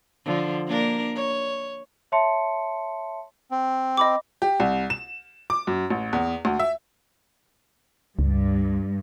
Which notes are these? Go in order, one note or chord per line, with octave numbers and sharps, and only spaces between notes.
D3 F3
A#3 D4 A#4
C#5
C#5 E5 A5 C6 C#7
C4
D#5 B5 D6
G4
C2
E7
D6
F#2
A1
E2
D2
E5
C#2 G2